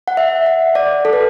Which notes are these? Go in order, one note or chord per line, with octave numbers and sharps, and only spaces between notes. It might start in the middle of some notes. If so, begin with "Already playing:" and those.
F#5
E5
F#5
D5
A4
B4